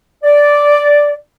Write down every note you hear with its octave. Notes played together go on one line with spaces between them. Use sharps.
D5